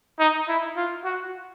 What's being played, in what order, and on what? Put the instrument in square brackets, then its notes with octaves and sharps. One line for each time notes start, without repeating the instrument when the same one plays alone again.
[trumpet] D#4
E4
F4
F#4